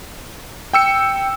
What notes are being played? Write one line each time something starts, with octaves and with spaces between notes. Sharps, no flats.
G5 E6 C#7